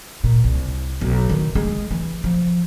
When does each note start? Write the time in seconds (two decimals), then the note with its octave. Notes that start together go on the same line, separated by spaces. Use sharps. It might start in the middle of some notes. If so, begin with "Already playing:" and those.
0.24 A#2
0.44 C2
1.01 B1
1.29 D#3
1.55 G#3
1.91 E3
2.24 F3